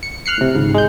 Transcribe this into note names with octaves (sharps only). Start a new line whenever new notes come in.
C#7
F6 F#6 C7 C#7
A2 C3
G#1 C#2 G#2
G#3 G6